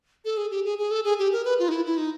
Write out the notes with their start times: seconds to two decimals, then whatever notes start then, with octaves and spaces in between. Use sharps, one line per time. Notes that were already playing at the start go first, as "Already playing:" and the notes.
0.25 A4
0.37 G#4
0.51 G4
0.65 G#4
0.78 G#4
0.91 A4
1.04 G#4
1.19 G4
1.33 A#4
1.45 B4
1.59 F4
1.69 D#4
1.72 E4
1.86 E4
1.97 D#4